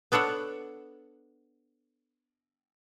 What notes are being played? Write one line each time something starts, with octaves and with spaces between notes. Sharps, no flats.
B3 D4 A4 C#5 F#5